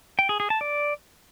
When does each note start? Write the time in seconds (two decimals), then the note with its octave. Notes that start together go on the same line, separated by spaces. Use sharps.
0.19 G5
0.29 G#4
0.40 G#4
0.50 A5
0.61 D5